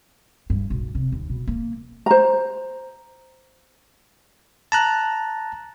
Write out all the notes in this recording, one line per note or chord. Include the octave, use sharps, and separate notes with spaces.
G2
B1
C3
D#2
B2
A#3
C5 A#5
A5 A#5 F#6